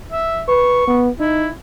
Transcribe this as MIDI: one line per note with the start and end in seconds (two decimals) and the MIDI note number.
0.12 0.43 76
0.48 0.87 71
0.48 1.03 85
0.87 1.09 59
1.19 1.48 63
1.19 1.51 64